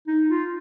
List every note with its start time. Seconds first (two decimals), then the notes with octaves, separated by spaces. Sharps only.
0.08 D#4
0.29 F4